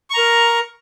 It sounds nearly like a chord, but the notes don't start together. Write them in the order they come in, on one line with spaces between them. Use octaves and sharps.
C#6 A#5 A#4